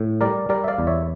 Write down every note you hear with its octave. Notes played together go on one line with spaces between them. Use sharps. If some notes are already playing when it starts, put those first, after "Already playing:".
Already playing: A2
G3 A#4 D5
G3 A#4 D5
E5
D5 F5
E2
C#5 E5